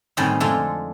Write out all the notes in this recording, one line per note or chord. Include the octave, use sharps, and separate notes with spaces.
A2 D#3 G3 C4 C#4 D#4
F2 D3 G#3 A3 F4 A4